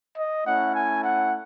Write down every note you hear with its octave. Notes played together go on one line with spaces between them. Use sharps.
D#5
A3 C#4 E4 F#5
G#5
F#5